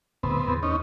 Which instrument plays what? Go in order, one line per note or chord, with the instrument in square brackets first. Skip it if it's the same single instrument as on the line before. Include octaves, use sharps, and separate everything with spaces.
[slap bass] D1 [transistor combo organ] B3 C4
[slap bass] E2
[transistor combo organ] C#4 D#4